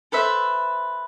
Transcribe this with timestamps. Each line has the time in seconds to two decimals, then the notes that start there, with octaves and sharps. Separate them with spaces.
0.12 A4 B4 C5 E5